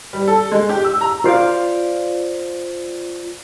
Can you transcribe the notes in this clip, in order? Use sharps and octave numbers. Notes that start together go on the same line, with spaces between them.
G3
A4
G#3
G4
E6
A#5
F4 C5 D5 F5